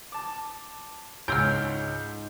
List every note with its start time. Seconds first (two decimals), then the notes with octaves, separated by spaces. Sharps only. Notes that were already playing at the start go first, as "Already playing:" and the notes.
0.12 A5 D6
1.28 C#2 G#2 C#5 G#5 C6 E6 F6 G6